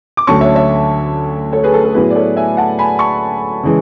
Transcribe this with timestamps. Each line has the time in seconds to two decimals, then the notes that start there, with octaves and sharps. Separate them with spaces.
0.17 D6
0.27 D2 D3 F#3 C#4 A5 C#6
0.41 C#5 E5
0.55 C#5 E5
1.52 A4 C#5
1.63 G#4 B4
1.74 A4
1.84 A4
1.94 A2 F#3 B3 E4 G#4 B4
2.10 D5
2.16 A4 C#5
2.37 E5 G#5
2.57 F#5 A5
2.79 G#5 B5
2.99 A5 C#6
3.63 C#3 E3 G#3